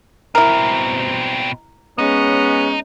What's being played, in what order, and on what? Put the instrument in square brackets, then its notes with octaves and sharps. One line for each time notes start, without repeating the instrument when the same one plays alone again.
[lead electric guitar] B2 C4 [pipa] E4 A#4
[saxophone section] G#3 B3 C#4 [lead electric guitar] D#4